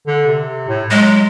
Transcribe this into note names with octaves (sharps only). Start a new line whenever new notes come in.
D3
C3
A2
F#3 G#3